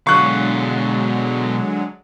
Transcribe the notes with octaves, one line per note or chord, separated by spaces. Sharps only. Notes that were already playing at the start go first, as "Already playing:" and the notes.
B2 D3 F#3 G#3 F5 C#6 F#6